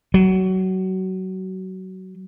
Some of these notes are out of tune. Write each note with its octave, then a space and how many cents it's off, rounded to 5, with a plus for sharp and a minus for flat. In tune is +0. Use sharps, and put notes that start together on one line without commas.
F#3 +20